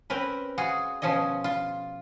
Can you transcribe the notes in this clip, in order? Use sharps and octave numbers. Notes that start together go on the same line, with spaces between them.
C4 C#4 A#4 B4
F4 F#4 G#4
B2 F3 C#4 G#4 D#5
F4